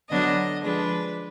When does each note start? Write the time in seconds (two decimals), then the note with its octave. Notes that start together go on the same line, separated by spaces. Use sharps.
0.10 D3 F#3 B3 D4 D#5
0.63 F3 G#3 D4 B4